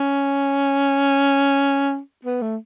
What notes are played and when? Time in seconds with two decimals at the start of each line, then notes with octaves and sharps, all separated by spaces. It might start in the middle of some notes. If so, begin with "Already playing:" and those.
Already playing: C#4
2.25 B3
2.41 A3